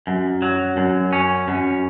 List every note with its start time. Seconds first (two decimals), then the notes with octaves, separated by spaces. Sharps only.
0.07 F#2
0.42 F#3
0.77 F#2
1.13 C#4
1.48 F#2